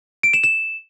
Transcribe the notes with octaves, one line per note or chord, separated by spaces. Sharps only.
D7
E7
E7